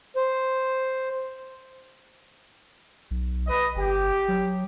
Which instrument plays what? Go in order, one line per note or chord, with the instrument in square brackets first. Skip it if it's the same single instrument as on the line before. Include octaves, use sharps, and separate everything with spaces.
[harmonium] C5
[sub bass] B1
[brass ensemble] B4 D#5
[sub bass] G1 [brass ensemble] G4
[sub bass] F#3